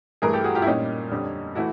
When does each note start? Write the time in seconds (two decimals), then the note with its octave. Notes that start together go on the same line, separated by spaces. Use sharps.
0.22 G2 E3 A3 G#4 A#4
0.33 G4 A4
0.44 F#4 G#4
0.55 F4 G4
0.62 E4
0.66 A#2 G3 A#3 C#4 D#4
1.11 F2 D3 G3
1.55 E3 A3 E4 F#4